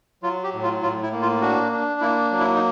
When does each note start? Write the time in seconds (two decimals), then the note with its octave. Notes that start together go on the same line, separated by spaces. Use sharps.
0.23 F#3 F4
0.44 G4
0.54 A2
0.63 F4
0.82 A2 F4
1.03 E4
1.12 A#3
1.22 F4
1.41 D4 F#4
1.72 D4
2.01 A#3 E4
2.31 F#3
2.40 E4
2.55 D#4